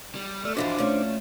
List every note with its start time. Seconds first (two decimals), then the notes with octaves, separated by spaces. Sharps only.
0.15 G3
0.45 A3 D5 E6 F6
0.57 G#2 E3 F3 D4 F#4 C5 F5 D6
0.78 A#2 A3 C#4